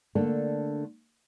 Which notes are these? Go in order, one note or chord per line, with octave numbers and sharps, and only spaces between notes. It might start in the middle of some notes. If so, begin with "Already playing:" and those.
D3 A3 A#3 D4